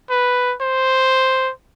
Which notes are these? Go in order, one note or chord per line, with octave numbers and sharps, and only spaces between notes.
B4
C5